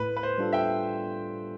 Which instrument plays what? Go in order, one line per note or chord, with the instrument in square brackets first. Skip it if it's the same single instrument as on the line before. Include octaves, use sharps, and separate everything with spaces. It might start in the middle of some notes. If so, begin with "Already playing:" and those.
Already playing: [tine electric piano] A2 [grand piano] B4
[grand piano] B4
C5
[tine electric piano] G3 D4 F4 A4
[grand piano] E5 G5